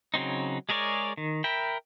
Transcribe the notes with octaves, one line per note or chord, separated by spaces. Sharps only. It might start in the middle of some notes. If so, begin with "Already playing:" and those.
C#3 F#3 C4 D#4
G#3 G#4 A#4 C#5 D5
D#3
A#4 E5 G5 B5